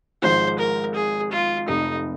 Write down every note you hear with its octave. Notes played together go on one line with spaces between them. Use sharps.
G#1 G#2 F3 C5
A#4
G#4
F4
F1 F2 C3 D#4